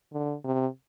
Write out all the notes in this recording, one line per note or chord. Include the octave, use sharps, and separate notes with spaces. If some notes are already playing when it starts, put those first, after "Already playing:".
D3
C3